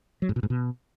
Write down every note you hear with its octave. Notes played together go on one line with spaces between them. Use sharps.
F#3
G#2
B2
G#2
B2